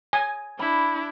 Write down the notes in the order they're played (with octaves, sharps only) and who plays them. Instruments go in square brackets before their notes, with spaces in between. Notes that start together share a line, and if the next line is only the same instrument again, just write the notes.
[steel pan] G#5
[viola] D4 E4 [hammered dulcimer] B5